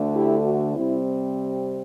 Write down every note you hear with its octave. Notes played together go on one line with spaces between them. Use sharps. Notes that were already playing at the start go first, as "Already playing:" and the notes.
Already playing: D2 D3 A3
E4 G4
F#4
C3 G3 C4 E4